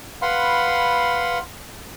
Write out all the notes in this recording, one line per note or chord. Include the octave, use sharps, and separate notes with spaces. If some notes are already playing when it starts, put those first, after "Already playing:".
B4 F5 F#5 B5 C6